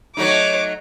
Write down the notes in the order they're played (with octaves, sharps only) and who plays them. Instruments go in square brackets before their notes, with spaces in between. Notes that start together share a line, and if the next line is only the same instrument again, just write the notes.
[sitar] F#3 A3 D#4 [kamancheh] C#5 D6